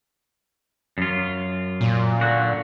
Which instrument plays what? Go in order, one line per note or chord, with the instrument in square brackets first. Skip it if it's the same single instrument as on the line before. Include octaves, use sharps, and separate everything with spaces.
[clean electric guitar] F#2 F4
[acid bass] A#2
[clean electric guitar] D3 F#4